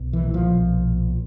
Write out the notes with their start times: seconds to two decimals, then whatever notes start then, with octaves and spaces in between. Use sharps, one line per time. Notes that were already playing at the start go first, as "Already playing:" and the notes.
Already playing: B1
0.13 E3
0.23 A#2
0.34 F3
0.55 B1
0.86 A#2